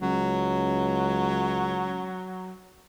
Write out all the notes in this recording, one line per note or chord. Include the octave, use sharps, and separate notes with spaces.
C#2 F#3